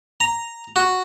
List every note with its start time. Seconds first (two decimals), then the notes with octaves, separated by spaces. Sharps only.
0.20 A#5
0.76 F#4